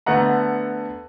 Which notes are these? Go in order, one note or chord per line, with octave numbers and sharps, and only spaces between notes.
D3 A3 B3 F#5 A#5